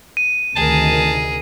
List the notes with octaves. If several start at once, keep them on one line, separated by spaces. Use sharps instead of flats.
D#7
D2 C3 D#3 G#4 A#4 A5